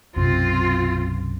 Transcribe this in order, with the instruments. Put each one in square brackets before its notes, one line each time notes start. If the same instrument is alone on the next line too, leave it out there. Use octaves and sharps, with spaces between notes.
[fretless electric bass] B1 F#2 C3 [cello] C4 F4